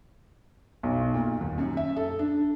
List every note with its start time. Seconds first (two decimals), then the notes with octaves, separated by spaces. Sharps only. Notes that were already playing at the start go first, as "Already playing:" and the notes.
0.83 B1
1.14 A#2
1.41 D#2
1.58 F#2
1.77 E5
1.96 A4
2.19 D4